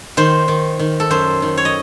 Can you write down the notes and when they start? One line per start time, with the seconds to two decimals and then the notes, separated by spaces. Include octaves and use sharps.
0.17 D#3 C5
0.48 D#3
0.79 D#3
1.00 A4
1.10 F#2 C5
1.42 D#3
1.57 C#5
1.65 D#5